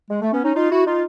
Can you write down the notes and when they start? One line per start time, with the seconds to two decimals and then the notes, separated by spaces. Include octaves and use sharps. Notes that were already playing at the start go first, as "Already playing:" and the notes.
0.09 G#3
0.21 A3
0.32 B3 C#4
0.44 C#4 D#4
0.55 D#4 F4
0.71 E4 F#4
0.86 D#4 F4